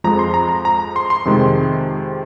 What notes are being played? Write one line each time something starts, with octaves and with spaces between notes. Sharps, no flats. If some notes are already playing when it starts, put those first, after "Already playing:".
F2 F3 G#3 A#5
C6
A#5
A#5
A#5
C6
C6
F2 C3 D#3 G#3